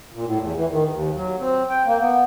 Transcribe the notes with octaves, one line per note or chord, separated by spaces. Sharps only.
A#2
A2
E2
E3
D#3
D#2
F#3
C4
G5
A#3
B3